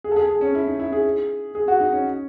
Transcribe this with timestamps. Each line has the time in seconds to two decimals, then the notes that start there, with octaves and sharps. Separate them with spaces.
0.04 G#4
0.11 A4
0.16 G#4
0.29 G#4
0.41 C#4
0.55 E4
0.67 D#4
0.79 E4
0.92 G#4
1.55 G#4
1.68 F#4
1.80 D#4
1.92 C#4